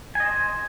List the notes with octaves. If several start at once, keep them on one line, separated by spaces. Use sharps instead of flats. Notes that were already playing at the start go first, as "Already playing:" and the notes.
C5 D#5 G#5